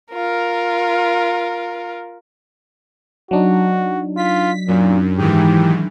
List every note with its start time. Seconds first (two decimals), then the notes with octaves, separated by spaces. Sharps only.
0.13 F4 A#4
3.31 F#3 D4 D#4 F#4
4.17 F4 B6
4.68 F#2 A#2
5.18 G#2 D#3 E3 G4